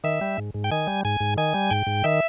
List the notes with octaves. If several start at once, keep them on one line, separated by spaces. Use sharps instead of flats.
D#3 E5
G3
G#2
G#2
G5
D#3 G#5
G3
G#2 G#5
G#2
D#3 G#5
G3
G#2 G5
G#2
D#3 E5